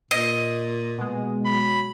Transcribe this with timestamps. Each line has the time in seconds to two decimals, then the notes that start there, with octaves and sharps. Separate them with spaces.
0.11 A#2 D#5
0.98 B2 G#3
1.46 F#3 B5